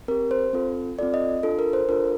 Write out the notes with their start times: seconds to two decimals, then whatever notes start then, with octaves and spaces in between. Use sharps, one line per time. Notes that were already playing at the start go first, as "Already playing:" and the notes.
0.08 C4 A#4
0.11 G4
0.31 C5
0.53 C4 F4 A4
0.99 C4 F4 A4 D5
1.14 D#5
1.43 D4 F4 A4
1.59 A#4
1.73 C5
1.89 D4 F4 A4 A#4